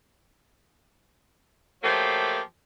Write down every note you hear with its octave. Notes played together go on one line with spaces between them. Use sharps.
F3 F#3 A3 A#3 G4